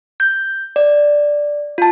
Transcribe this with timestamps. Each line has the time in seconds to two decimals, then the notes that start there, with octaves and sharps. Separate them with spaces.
0.20 G6
0.76 D5
1.78 F4 A5